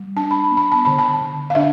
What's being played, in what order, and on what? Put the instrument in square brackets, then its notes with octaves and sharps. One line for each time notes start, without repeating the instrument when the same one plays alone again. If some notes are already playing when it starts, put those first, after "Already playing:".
Already playing: [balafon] G3
D4 A5
B5
A5
B3
B5
A5
D3 B5
A5
D3
F5
D4 E5